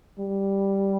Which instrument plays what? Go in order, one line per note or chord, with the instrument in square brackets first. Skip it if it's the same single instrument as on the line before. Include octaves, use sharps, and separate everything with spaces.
[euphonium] G3